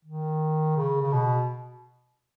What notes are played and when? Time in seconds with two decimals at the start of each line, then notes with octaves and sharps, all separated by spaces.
0.05 D#3
0.77 C#3
1.02 C#3
1.13 B2